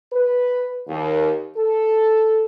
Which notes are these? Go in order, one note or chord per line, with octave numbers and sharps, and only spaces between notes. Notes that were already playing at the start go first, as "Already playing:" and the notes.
B4
D#2
A4